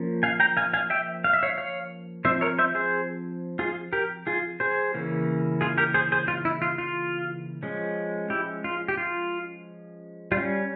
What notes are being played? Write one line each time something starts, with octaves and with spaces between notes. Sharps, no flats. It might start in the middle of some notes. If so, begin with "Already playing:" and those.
Already playing: F3 A#3 C#4
F5 G#5
G5 A#5
F5 G#5
F5 G#5
E5 G5
F5
E5
C#5 F5
C#5 F5
F3 C4 C5 E5
A#4 C#5
C5 E5
G#4 C5
F4 G#4
G4 A#4
F4 G#4
G#4 C5
C#3 E3 A#3 C#4
F4 G#4
G4 A#4
G#4 C5
G#4 C5
F4
E4
F4
F4
F3 G#3 C#4
E4 G4
F4
G4
F4
G3 C#4 F4